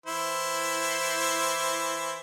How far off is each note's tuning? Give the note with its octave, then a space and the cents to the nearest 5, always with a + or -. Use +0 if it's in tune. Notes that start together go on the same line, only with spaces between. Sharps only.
E3 +0 E4 +10 C5 +5